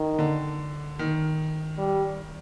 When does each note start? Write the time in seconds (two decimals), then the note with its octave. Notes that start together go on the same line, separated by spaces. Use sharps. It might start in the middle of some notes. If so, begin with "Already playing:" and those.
Already playing: D#3
0.19 D3
0.99 D#3
1.79 G3